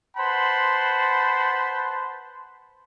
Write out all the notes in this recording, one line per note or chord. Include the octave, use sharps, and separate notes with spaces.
B4 C5 F#5 A5 B5 C6